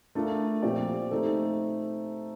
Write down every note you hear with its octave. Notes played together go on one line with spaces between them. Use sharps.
A3 D4 F4 A#4
A#2 F3 C4 G4 D5
A3 C4 D#4 A4